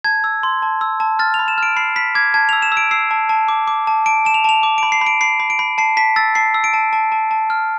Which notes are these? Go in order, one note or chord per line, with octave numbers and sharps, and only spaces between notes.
A5 G#6
E6
C6
A5
E6
A5
F6 A6
F7
B5
E7
F6 D7
B5 C7
B5 B6
D6 G#6
A5 G#6
F7
E6
E7
E6
D7
E6 C7
A5
A5
D6
D6
A5
A5 D7
A5 E7
F7
A5 F7
D6
D7
B5
C7
B5
D7
B5 C7
B5
D7
B5
A5 C7
A5 B6
E6 A6
A5 C7
E6
D7
A5
A5
A5
A5
F6